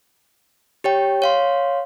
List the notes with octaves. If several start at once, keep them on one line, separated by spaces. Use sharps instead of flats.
G4 C#5 G5
C#5 F5 C6